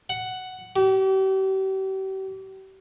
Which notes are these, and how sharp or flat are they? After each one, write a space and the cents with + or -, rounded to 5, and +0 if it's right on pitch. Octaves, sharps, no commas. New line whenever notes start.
F#5 +5
G4 -40